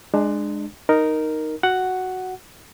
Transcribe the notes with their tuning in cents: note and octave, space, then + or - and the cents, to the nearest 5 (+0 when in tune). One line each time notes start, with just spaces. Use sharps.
G#3 +0 D4 +25
D#4 +0 A#4 +0
F#4 +0 F#5 +5